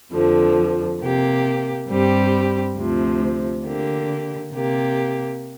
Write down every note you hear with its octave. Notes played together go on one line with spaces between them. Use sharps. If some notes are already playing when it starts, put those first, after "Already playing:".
F2 D3 F3
C3 A#3 G4
G2 G3 C4 G4
D2 C3 F3
D3 A#3 G4
C3 A#3 G4